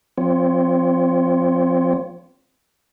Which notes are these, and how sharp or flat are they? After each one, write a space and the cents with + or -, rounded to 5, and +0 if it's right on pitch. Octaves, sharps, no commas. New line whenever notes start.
F3 +0 C4 +0 C#5 +35